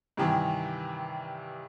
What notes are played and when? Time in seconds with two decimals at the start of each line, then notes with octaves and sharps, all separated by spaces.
0.17 G2 C3 D#3 E3